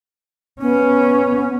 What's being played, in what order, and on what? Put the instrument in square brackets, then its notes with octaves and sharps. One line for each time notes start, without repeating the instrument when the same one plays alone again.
[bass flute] B3 [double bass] C#4